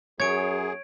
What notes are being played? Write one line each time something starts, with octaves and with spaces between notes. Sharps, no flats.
F#2 G#4 C#5 G#6 D7